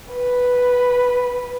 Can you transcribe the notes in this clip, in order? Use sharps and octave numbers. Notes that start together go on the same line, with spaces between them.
B4